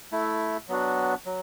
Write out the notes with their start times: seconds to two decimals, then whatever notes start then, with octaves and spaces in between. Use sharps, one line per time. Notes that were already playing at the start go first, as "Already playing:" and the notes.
0.12 A3 E4
0.68 F#3 B3 D4 F#4
1.26 F#3